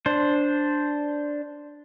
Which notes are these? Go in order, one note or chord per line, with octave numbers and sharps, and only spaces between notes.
D4 C5